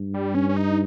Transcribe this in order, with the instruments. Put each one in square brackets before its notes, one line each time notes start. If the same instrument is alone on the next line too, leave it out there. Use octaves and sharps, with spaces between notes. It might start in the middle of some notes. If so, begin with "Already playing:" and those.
Already playing: [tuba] G2
[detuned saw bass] G3
C#4
C#4
D#4